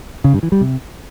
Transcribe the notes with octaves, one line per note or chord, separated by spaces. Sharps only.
C#3
G2
E3
G3
C3